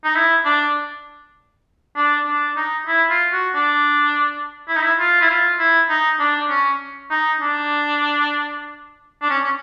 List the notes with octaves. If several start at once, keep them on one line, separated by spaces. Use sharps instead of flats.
D#4
E4
D4
D4
D4
D#4
E4
F4
F#4
D4
E4
D#4
E4
F4
E4
F4
E4
D#4
D4
C#4
D#4
D4
D4
C#4
C#4